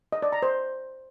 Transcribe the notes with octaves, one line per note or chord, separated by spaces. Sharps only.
D#5
D5
A#5
C5